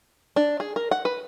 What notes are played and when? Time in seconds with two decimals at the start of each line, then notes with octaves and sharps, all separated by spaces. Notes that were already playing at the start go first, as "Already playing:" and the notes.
0.36 D4
0.60 G#4
0.76 A#4
0.91 F#5
1.05 B4